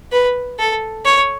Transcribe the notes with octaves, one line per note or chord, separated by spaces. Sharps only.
B4
A4
C#5